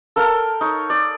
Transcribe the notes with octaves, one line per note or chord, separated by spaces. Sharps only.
A4 A#4 F5 G5
D#4 C#5
D5